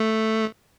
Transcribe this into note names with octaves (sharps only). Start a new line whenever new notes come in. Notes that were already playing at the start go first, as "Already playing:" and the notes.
Already playing: A3